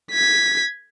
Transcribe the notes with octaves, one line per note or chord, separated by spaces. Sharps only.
G#6 B6